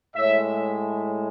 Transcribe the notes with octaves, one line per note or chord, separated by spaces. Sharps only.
A2 G#3 C#5 E5